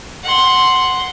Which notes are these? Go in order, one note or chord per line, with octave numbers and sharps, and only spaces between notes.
F#5 C6